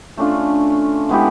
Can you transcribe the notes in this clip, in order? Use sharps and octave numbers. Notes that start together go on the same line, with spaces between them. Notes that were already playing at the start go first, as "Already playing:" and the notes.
A3 C#4 D4 F4
G#3 B3 E4 G4